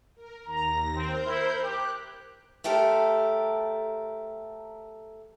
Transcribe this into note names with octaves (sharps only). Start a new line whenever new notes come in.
A#4
D#2 A#5 A#6
C4 A#4 C5 G6
E4
G4 F#6
A3 G4 A4 A#4 C5